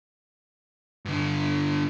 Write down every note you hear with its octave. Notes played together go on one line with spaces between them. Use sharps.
G2 D3